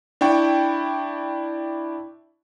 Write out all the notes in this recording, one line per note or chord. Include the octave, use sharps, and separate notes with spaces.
D4 E4 G5 C#6